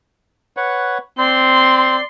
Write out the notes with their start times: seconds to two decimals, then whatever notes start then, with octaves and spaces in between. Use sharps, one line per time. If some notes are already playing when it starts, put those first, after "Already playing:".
0.57 B4 C#5 F#5
1.18 C4 D5 C6